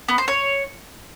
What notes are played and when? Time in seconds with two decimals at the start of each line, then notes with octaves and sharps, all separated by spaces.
0.08 B3
0.18 C5
0.28 C#5